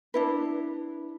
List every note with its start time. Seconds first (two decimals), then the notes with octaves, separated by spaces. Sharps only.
0.14 D4 E4 B4